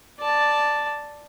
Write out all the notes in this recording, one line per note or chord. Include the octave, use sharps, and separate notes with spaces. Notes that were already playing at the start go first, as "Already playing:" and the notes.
D5 A5